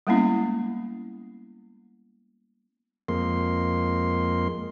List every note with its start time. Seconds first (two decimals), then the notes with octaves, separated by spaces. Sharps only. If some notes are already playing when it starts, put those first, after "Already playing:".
0.07 G3 G#3 A#3 B3 C#4 E4
3.08 F2 G#3 A#3 C6